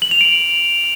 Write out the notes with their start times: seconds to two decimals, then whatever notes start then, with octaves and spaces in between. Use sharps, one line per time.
0.02 F#7
0.11 F7
0.21 D7